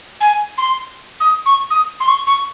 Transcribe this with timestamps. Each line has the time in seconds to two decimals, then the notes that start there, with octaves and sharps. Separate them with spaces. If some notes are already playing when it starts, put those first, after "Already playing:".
0.21 G#5
0.58 C6
1.20 D#6
1.46 C#6
1.70 D#6
2.00 C6
2.08 C#6
2.27 C#6